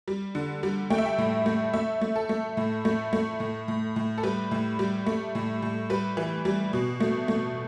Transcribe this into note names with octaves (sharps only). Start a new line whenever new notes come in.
G3
D3
G3
A3 G5
E5
G5
A2
A3
A3 E5
A3
A4
A3
A2
A3
A3
A2
A2
A2
A4
G3 B4
A2
G3
A3
A2
A2
G3 B4
E3
G3
B2
A3
A3